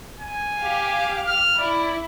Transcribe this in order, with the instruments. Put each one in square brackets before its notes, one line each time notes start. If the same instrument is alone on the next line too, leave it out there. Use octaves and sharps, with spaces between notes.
[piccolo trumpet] G#5
[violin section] G4 F5
[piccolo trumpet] F6
[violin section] E4 [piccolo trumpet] D5